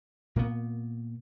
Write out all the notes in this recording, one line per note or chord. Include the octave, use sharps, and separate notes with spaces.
A#2 A#3 B3